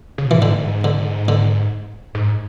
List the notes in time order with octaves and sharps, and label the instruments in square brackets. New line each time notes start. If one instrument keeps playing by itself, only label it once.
[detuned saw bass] C#3
B2
[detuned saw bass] A2 [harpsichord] E3
[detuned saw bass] G#2 [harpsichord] D3
[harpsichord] D3
D3
[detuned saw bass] G#2